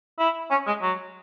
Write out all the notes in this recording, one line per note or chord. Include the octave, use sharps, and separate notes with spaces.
E4
C#4
G#3
F#3